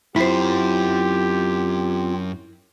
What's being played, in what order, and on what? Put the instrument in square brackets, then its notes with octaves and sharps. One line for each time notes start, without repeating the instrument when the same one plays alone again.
[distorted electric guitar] F#2 [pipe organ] C4 F4 [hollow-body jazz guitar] E4 C5 [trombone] G4